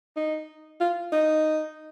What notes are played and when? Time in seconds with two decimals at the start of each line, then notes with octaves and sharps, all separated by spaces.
0.17 D#4
0.80 F4
1.12 D#4